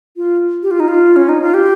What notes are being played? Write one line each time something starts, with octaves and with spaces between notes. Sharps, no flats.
F4
G4
F4
D#4
F4
C#4
D#4
F4
G4